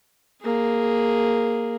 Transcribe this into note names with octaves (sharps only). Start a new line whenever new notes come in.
A#3 G#4